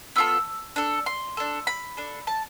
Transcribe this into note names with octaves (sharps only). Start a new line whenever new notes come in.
B3 F4 A4 E6
D4 A4
C6
D4 A4
B5
D4 A4
A5